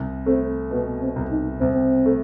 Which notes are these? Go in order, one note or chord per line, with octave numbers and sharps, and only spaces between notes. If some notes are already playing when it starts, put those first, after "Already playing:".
Already playing: C2
A3 C4
B2 B3
C4
C2
D#4
C2 C4
A3